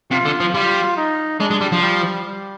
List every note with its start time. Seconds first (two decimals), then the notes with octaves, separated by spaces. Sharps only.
0.11 C3 F4
0.26 D3
0.40 F3
0.55 G3 F4
0.97 D#4
1.40 G#3 D4
1.51 G#3
1.61 G3
1.72 F3
1.82 G3
2.26 G3